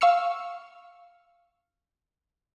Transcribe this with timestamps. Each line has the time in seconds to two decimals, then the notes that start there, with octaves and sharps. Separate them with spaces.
0.01 F5 C#6 E6 F6 C#7